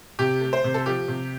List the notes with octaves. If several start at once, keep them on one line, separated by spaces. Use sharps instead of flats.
C3 G4
A3
C5
C3
A4
F3 G4
C3